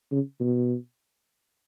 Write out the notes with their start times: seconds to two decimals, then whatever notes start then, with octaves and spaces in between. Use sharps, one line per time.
0.12 C#3
0.40 B2